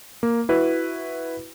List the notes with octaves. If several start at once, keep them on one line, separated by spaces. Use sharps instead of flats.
A#3
E4 F#4 B4